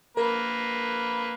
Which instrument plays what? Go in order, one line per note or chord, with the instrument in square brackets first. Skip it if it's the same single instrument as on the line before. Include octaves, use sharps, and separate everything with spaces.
[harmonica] A#3 B4 [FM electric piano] A#4